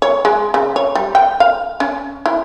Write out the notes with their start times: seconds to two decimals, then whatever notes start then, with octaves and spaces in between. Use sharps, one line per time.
0.02 C#5
0.25 G#3
0.54 C#3
0.76 C#5
0.95 G3
1.15 G5
1.40 F5
1.80 C#4
2.26 E4